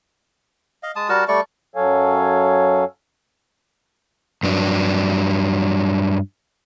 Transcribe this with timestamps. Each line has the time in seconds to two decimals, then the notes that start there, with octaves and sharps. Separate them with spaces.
0.83 D#5 F5
0.96 G#3 A5 D#6
1.09 G3 F#4 A#4 A5
1.28 G3 A3 D5 C#6
1.76 F#2 F#3 A4 C#5 F5 G#5
4.43 G2 F#3 D4